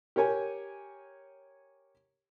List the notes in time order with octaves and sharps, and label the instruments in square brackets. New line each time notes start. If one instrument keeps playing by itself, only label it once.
[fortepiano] G4 A#4 C#5 G#5